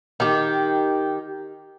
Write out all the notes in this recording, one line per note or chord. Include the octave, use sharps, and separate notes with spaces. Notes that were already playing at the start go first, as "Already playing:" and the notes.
D#3 G4